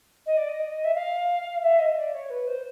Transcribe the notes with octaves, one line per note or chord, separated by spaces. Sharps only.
D#5
D5
D#5
E5
F5
E5
D#5
D5
C#5
B4
C5